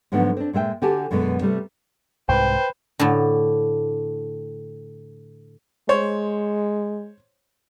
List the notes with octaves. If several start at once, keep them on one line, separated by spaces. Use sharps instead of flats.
G#2 D3 F3 F#3 A3 B3
C4 D4
A#2 G#3 E5 G5
D3 F#4 G4 G#5 A5
F#2 B2 D3 G#3 B3
C3 G3 A3
C2 G#2 B4 C5 G5
A2 D3
G#3 C5 C#5